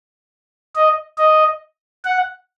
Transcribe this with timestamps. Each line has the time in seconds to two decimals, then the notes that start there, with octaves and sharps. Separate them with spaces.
0.75 D#5
1.18 D#5
2.05 F#5